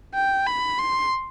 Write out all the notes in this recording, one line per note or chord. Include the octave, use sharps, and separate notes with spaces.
G5
B5
C6